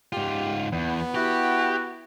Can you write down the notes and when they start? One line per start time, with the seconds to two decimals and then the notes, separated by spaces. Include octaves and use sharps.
0.13 G#2 F4 G4
0.73 E2 B3
1.15 E4 F#4 G4